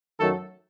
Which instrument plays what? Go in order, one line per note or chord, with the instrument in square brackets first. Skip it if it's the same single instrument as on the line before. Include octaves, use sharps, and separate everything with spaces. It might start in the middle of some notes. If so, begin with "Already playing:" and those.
[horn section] F#2 D#3 F#3 A3 A4